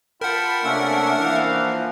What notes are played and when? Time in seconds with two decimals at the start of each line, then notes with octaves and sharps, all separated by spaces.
0.21 F4 A#4 F#5 G5 A5 B5
0.64 C3 A3 A#3 C#4 D4 E5
1.17 E3 F3 A#3 F5